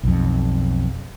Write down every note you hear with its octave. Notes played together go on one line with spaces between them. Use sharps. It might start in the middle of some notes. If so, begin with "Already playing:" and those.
B1 F2